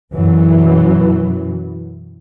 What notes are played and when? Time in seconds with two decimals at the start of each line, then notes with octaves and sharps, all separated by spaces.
0.14 F#2 B2 E3 F#3